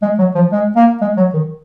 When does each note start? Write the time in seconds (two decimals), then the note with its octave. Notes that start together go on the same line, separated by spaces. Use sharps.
0.02 G#3
0.18 F#3
0.35 F3
0.52 G#3
0.76 A#3
1.01 G#3
1.17 F#3
1.34 D#3